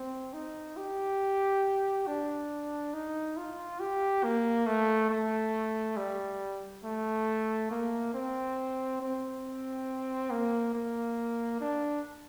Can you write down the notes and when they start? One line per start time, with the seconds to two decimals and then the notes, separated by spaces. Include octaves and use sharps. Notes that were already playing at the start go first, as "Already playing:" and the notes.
Already playing: C4
0.33 D#4
0.76 G4
2.07 D4
2.93 D#4
3.37 F4
3.80 G4
4.24 A#3
4.66 A3
5.10 A3
5.97 G3
6.84 A3
7.71 A#3
8.14 C4
9.01 C4
10.31 A#3
10.74 A#3
11.61 D4